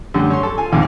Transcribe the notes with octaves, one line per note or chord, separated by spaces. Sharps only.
F#2 D3 G3 A3
C#5 C6
A4
F4 G#5
A#1 D#2 G#2 C3